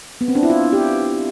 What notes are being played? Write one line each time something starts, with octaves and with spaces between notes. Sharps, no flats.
B3
C4
D4
E4
F4
G4